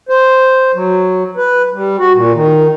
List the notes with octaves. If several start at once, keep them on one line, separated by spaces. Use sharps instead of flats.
C5
F#3
B4
G3
F#4
A#2
D#3